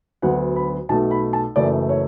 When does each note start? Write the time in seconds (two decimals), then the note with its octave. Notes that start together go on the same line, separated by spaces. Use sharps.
0.22 D2 D3 F#3 B3 F#5
0.56 B5
0.89 B1 B2 A3 A5
1.11 B5
1.33 A5
1.56 F#1 F#2 E3 A3 D5
1.89 C#5